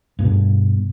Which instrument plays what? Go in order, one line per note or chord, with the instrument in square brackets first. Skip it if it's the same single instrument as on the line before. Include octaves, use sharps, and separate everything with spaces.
[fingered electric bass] G2 B2